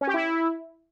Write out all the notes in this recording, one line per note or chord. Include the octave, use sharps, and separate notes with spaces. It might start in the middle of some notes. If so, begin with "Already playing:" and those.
C#4
G4
E4